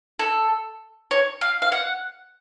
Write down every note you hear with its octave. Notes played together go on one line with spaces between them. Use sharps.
A4
C#5
F5
F5
F#5